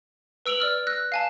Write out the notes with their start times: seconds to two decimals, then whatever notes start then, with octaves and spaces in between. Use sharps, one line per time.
0.46 B4 E6 D7 F7 F#7
0.60 D5 E6 F6
0.87 E6 F#6 A#6
1.12 F5 G#5 A5